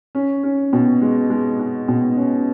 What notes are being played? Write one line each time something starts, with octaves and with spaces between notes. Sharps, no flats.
C#4
C#4
B2
G#3
G#3
G#3
B2
C#4